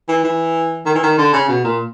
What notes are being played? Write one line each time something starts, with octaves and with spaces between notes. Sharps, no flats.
E3
E3
D#3
E3
D#3
D3
C#3
B2
A#2